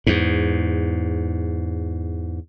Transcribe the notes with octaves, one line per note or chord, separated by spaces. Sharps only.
E2 G#2